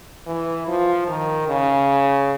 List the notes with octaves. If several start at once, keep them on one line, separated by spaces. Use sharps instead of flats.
E3
F3
D#3
C#3